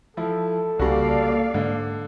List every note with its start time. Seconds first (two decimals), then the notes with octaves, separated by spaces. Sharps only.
0.17 F3 E4 A4
0.79 C2 C#3 G3 A#3 F#4 D5 F5
1.54 G#2 D3